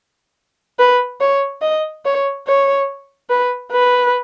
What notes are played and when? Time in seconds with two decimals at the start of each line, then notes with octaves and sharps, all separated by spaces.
0.79 B4
1.20 C#5
1.62 D#5
2.05 C#5
2.47 C#5
3.30 B4
3.72 B4